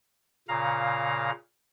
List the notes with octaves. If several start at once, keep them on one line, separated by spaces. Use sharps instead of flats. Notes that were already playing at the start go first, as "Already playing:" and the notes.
A#2 C#3 F5 A#5